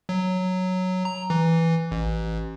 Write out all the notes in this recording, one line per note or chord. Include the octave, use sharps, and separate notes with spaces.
F#3
A#5
E3
A1